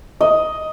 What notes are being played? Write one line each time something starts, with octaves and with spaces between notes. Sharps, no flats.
D#5